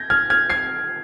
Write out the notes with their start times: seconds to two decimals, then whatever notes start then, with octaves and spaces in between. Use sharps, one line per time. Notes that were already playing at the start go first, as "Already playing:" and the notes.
Already playing: G6 G#6 A#6
0.10 F6 G#6
0.30 F6 G#6
0.50 G#6 C7